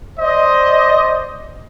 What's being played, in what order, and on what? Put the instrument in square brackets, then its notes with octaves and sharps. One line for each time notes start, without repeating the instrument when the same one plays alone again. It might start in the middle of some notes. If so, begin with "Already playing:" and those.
[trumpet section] C5 D5 D#5